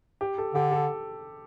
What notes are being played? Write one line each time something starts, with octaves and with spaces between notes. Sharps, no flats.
G4
A4
D3 G4
A4